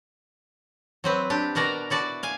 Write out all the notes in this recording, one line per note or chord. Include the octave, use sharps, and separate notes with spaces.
F#3 C4 B4
D4 G4
B2 F#4 A#4 D5 A#5
E4 F#4 D5 A5
F5 G#5